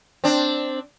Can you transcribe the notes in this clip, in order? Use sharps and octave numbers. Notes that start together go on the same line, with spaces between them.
C4 D4